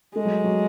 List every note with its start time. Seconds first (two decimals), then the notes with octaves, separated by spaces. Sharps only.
0.15 G#3 A3
0.25 F#3
0.44 F#3